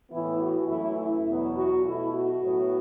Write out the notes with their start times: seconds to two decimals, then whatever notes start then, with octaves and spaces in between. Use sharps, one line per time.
0.11 A2 E3 B3 E4
0.40 F#4
0.69 F#2 E3 A3 E4
0.99 E4
1.28 E2 B2 F#3 B3
1.56 F#4
1.85 B2 A3 E4
2.13 F#4
2.42 A2 F#3 B3